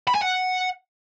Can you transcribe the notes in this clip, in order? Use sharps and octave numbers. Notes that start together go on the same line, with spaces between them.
B5
G#5
F#5